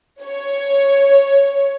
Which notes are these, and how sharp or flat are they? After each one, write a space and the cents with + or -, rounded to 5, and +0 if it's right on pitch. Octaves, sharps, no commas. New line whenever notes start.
C#5 +5